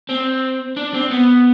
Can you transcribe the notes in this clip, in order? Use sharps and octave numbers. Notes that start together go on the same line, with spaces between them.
C4
D4
C4
B3